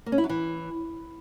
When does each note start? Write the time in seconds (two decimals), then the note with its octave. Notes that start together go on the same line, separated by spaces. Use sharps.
0.06 A#3
0.12 C#4
0.18 E4
0.24 F#3
0.29 E3